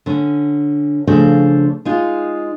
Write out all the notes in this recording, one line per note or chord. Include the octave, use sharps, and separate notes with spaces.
D3 C#4
C#3 F3 A3 D4 A4 C5
G#3 D#4 F4